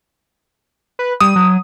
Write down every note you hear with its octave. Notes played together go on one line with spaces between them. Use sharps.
B4
G3 D#6
F#3